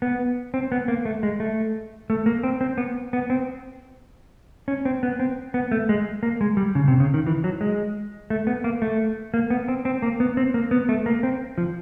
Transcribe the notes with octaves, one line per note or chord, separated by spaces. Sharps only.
B3
C4
B3
A#3
A3
G#3
A3
A3
A#3
C4
C4
B3
B3
C4
C#4
C4
B3
C4
B3
A3
G#3
A#3
G#3
G3
C#3
C3
C#3
D#3
E3
F#3
G#3
A3
B3
A#3
A3
A#3
B3
C4
C4
A#3
B3
C4
A#3
B3
A3
A#3
C4
F3